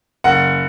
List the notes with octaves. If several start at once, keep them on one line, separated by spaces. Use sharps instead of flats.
F#1 F#5